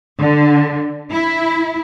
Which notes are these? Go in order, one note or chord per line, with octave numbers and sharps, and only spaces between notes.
D3
E4